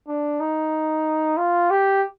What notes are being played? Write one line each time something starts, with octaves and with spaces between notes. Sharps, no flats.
D4
D#4
F4
G4